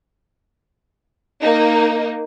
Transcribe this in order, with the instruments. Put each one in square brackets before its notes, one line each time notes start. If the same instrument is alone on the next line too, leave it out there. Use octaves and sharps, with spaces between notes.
[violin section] A#3 D#4